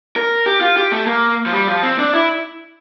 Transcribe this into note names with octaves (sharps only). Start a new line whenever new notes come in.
A#4
G4
F4
G4
A3
A#3
F3
G3
F3
C4
D4
E4